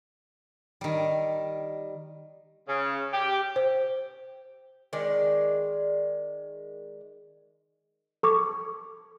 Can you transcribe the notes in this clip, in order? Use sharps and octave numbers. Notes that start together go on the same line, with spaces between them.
D#3 G3
C#3
G4
C5
D#3 G#3 D5
A4 C#6 D6